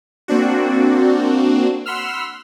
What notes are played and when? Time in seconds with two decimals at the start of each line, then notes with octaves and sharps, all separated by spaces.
0.28 A#3 C4 D4 F#4
1.86 F#5 B5 C6 E6 F6